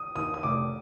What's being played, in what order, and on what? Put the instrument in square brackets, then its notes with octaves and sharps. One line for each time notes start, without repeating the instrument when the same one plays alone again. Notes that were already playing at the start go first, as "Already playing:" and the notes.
Already playing: [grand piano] D#6
[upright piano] D#2 [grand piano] D#6
[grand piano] D#6
[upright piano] F1 [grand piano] D6